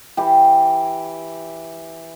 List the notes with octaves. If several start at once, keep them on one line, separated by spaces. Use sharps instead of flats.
E3 G4